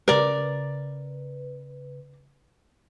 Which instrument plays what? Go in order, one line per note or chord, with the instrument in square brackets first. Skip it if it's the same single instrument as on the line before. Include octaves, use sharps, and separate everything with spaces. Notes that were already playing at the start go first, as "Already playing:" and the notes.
[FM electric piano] C#3 B4 [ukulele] A#4 D5